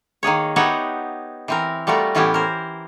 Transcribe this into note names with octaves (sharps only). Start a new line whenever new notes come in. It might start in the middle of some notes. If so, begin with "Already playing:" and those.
D#3 A#3 G#4 C#5
B3 D#4 G4 C#5 E5 F#5
E3 C4 A#4
G3 A3 F4 F#4 A#4
A2 E3 B3 C#4 E4 G4
A#4 C5